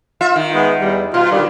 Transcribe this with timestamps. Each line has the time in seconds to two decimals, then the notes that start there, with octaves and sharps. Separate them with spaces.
0.21 F4 E5
0.36 D#3
0.54 G#3 B3
0.81 E2 G3
1.14 B2 F4
1.32 D3 D#3 G3